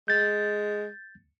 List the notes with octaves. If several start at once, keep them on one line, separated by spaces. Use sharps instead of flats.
G#3 G6 A6